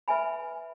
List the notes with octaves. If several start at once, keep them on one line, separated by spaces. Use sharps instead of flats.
B4 E5 G#5 B5